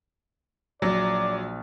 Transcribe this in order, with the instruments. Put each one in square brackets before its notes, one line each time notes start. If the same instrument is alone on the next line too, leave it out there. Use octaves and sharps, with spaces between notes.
[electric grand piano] A#1 A6 [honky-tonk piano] F#3 [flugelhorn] D5